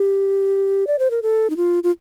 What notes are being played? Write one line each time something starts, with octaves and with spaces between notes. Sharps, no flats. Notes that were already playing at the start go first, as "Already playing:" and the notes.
Already playing: G4
D5
C5
A#4
A4
D#4
F4
F4